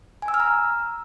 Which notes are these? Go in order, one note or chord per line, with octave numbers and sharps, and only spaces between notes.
G#5
E6
F6
A#5